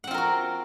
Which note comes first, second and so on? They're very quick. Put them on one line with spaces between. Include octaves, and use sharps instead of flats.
F#5 C4 F4 A#4 F#4